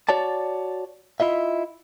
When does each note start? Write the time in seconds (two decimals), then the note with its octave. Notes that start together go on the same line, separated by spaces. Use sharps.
0.09 F#4 C#5 D5 A5
1.20 E4 F4 D#5 E5